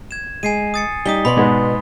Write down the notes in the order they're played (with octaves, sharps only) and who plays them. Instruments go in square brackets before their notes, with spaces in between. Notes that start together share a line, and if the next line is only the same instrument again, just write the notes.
[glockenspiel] G#6 E7
[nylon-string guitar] G#3 [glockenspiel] G#5 C7 D#7
[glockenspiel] D#6 A6 C#7
[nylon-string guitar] G3 D#4 [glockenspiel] D#6 B6 G7
[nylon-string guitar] B2 B4 D5 [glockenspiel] B5 C6
[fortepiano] G#2 G#3 B3